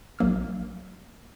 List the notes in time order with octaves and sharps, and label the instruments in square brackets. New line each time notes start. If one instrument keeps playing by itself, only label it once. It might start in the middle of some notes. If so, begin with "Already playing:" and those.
[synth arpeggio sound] A#1 F#3 A#3 E6 F6